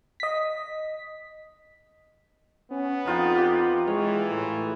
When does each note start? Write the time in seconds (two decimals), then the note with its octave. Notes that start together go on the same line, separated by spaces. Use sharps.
0.20 D#5 B6
2.71 B3 C#4
3.06 F2 D#4 F4 G5
3.36 F4 G4
3.87 E3 G#3 C#5
4.30 A2